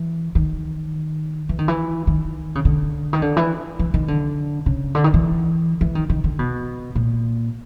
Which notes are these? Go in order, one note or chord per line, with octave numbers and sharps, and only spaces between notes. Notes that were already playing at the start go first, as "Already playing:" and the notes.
Already playing: E3
D#3
E3
D#3
E3
D#3
C#3
D3
D#3
D3
E3
E3
D#3
D3
C#3
D3
D#3
E3
E3
D#3
D#3
D3
B2
A#2